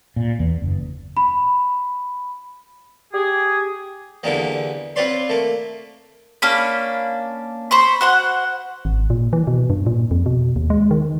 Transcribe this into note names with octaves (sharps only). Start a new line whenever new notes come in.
A#2
E2
F#1
B5
G4 G#4
E2 D3 E3 G3 A#3
C4 F4 B4 C#5 D5 C6
A3 A#3
A#3 C#4 D4 B5
C5 B5 C#6
F#4 C5 F#5
G#1
A#2
E3
B2
G2
A#2
F2
B2
D#2
G#3
D#3